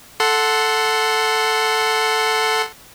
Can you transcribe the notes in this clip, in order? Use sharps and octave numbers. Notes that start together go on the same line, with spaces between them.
A4 F#5 C6